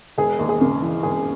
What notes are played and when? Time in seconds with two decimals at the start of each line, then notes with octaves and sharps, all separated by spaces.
0.18 E1 G#4
0.39 D#2
0.49 G#4
0.60 C#3 A#4
0.82 E3
1.03 E1 G#4